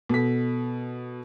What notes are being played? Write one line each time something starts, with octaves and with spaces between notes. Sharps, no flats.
B2 A4 B6